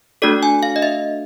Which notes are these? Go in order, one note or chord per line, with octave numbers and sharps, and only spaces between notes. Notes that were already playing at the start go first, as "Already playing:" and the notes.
A3 D4 F#4 A4 D5
G#5
F5
D#5
E5